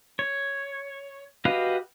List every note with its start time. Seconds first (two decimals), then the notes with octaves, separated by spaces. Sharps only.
0.19 C#5
1.45 F#4 G4 B4 D#5 F5